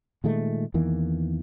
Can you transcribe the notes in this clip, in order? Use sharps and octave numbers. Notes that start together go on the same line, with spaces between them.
A#2 D#3 G#3 A3
E2 D#3 E3 A#3